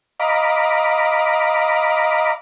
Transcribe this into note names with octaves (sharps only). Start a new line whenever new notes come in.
D#5 F5 A#5 B5 D6